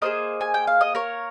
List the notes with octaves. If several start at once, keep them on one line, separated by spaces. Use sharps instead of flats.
A#3 F4 G#4 C5 D#5
G#5
G5
F5
D#5
A#4 C#5